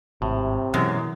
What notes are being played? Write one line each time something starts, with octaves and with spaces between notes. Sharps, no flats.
G#1 A2 C3
F#2 B2 E3 G#3